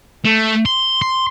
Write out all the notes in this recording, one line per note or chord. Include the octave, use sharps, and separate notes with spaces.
A3
C6
C6